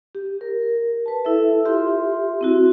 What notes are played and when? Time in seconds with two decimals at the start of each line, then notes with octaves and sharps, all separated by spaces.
0.15 G4
0.41 A#4
1.06 B4 A5
1.25 E4 A4 E5
1.65 F4 G4 E5 C6
2.41 C4 E4 F#4